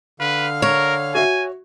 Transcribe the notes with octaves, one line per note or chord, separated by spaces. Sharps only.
D3 B4 F5 F6
A#4 C#5
F#4 E5 G#5